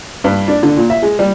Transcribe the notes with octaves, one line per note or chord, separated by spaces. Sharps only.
G2
D4
D3
A#2
E5
G#3
G3